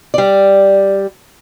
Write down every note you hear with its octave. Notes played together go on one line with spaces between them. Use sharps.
G3 D5